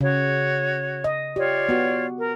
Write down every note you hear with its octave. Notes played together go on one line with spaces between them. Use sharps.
C#3 F#4 C#5
D#5
F4 G4 C#5 D5
B3 F#4
A#4